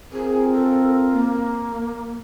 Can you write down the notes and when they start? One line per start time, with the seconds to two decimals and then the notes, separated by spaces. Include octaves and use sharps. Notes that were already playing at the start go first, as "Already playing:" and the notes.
0.13 C4 F4 G#4 A#4
0.53 A4
1.13 A#3